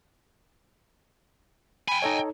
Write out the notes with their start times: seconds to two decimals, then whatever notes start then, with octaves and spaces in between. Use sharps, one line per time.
1.88 G5 G#5 B5
2.02 D#4 A4 C#5 D#5